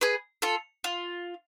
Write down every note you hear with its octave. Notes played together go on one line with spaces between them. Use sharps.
G#4 B4
F4 A4
F4